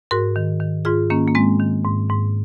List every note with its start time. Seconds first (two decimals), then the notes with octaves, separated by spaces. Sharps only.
0.11 G#2 F#4 A#4
0.36 D#3
0.60 D#3
0.85 G#2 F4 G#4
1.10 D#3 A#3 C#4
1.27 A#3
1.35 G#2 G#3 C4
1.60 D#3
1.85 G#2
2.10 G#2